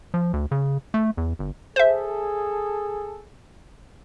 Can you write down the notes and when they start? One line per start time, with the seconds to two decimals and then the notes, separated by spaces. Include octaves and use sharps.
0.14 F3
0.33 D2
0.51 C#3
0.94 A3
1.17 E2
1.39 G1
1.76 G#4 A4 C5 E5